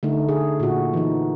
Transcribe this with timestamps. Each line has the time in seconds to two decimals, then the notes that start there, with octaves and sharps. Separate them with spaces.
0.03 D3 A3 D#4
0.29 G#4
0.60 A#2 F#4
0.93 E3 D#4